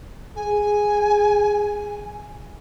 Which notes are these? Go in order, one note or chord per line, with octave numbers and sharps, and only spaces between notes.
G#4 G#5